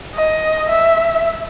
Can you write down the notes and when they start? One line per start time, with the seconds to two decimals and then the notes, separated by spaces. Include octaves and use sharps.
0.15 D#5
0.70 E5